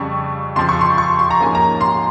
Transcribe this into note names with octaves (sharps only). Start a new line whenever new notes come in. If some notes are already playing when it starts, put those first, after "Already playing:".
Already playing: F2 C#3 G3 C#6
F2 C#3 F3 C6
C#6
C6
C#6
C6
A#5
G#2 F3 A#3 C#4 G#5
A#5
C6